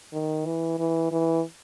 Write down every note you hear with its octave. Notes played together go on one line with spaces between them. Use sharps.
D#3
E3
E3
E3